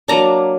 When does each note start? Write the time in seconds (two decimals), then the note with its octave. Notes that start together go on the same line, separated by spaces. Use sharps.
0.08 F#3 A#3 D4 A#5